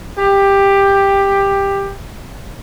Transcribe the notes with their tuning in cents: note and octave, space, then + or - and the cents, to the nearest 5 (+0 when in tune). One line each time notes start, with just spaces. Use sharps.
G4 +10